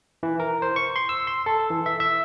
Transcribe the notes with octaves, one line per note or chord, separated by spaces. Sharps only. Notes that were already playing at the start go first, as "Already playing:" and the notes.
E3
A#4
C5
C#6
C6
E6
C6
A4
E3
E5
E5